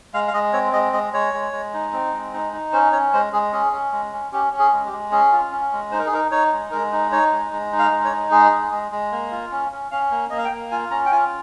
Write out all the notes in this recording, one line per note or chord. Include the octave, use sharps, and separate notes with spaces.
G#3 F5
F5
G#3 D#5
C4 C#5
G#3 D#5
G#3 D#5
G#3 C#5
G#3
G#3
D#4
C4
G#3
D#4
D#4
C#4 C5
C#4 C#5
G#3 C5
G#3 G#4
C#4 G#4
C#4
G#3
C#4
C#4 G4
C#4
G#4
G#3
G4
G#3
C#4 G#4
F4
C#4
G#3
D#4 C5
A#4
G#4
D#4 A#4
D#4 C#5
G#3
G#3 A#4
D#4
D#4 C#5
G#3
G#3
D#4
F5
G#3
C#5
D#4
G#3 G#4
G#3
G#3
G#3
A#3
F4
C#4
C#4
C#4 F5
A#3
A#3 D#5
F5
G5
A#3
F4 G#5
C#4 A#5
G5
F4 G#5